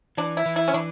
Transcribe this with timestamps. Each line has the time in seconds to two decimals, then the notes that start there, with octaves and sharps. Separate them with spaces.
0.17 E3 D4
0.37 E4
0.46 E3
0.56 E4
0.68 C#4
0.74 E3 D4